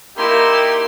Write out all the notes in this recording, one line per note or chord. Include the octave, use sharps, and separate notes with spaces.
A#3 D#4 E4 G4 C6